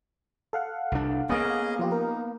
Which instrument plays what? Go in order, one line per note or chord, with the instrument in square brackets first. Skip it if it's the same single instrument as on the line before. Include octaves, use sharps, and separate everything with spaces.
[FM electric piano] A4 F5 F#5
[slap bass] C2 D4
[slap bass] A#3 B3 [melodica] C#4 G#4 D#5
[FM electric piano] F3 F4 G4
[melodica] D#4 [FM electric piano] A#4